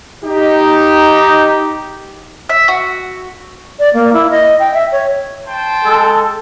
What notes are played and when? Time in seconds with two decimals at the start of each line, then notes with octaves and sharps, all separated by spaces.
0.24 D#4 G4
2.49 E5
2.68 F#4
3.79 D5
3.94 A#3
4.13 E4
4.30 D#5
4.60 G5
4.74 E5
4.92 C#5
5.48 C5 G5 A5
5.85 G#3 A4